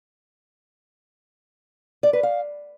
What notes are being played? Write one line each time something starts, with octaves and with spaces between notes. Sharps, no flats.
D5
B4
F5